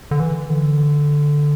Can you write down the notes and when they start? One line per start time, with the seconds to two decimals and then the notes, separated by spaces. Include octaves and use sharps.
0.11 D3
0.20 E3
0.50 D3